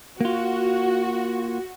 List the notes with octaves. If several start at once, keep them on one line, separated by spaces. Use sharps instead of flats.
A#3 F4 F#4